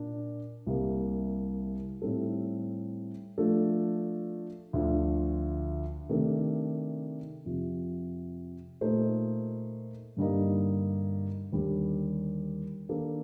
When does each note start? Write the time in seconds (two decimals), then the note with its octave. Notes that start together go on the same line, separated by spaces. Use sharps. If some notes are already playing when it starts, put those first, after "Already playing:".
Already playing: A#2 D4
0.66 C2 C3 G3 A#3
2.02 A2 G3 C4 D#4 A4
3.38 F3 A3 D4 A4
4.73 D2 D3 F3
6.09 C3 D#3 A3 D4 A4
7.45 F2 C3 F3
8.81 A#2 A3 D#4 A4 C5
10.17 G2 D3 G3 A#3 D#4
11.52 D#2 D3 G3
12.89 D#3 A#3 D4 A4